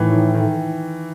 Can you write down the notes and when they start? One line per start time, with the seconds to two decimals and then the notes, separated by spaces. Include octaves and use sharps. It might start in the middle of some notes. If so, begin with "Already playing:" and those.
Already playing: A2 D#3 E3
0.12 D#3
0.34 D#3